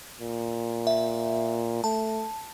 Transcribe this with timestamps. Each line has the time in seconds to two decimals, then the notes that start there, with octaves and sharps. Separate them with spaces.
0.21 A#2
0.87 E5
1.84 A3 A5